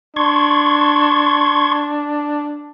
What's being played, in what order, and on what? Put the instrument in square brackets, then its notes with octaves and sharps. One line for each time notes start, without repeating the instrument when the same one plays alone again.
[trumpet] D4 [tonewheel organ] C6 C#6 G#6